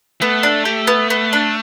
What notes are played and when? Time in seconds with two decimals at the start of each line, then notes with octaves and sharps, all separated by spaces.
0.21 A3 B3
0.43 D4
0.65 G4
0.87 B3
1.10 B3
1.33 D4